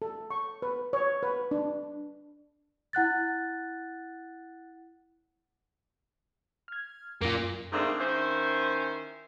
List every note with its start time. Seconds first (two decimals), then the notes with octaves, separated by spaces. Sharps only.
0.02 A4
0.31 C#6
0.62 B4
0.93 C#5
1.23 B4
1.51 D4
2.93 E4 F#5 F#6 A6
6.68 F6 G#6
7.22 F#2 A#3 F4
7.72 G#2 D#3 A3 A#3 C4 D4
7.99 D#3 C#4 E4 C5